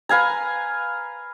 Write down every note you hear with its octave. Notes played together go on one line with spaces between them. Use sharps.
B4 F5 G#5 A#5